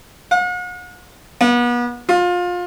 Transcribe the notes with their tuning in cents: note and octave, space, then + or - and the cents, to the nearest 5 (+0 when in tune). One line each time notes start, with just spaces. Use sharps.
F#5 -45
B3 -35
F4 +25